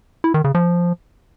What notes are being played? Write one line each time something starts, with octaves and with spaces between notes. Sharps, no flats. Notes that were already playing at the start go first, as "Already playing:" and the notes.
E4
D#3
C#3
F3